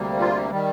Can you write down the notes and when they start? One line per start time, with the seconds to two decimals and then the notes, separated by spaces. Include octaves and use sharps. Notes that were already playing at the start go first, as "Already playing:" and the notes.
Already playing: D2 C3 G3 A#3
0.20 F4
0.51 D#3 G3